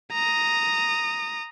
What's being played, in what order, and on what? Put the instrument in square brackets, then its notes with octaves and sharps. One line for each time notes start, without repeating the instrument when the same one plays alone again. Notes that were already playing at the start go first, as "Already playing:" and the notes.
[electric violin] A#5 D#6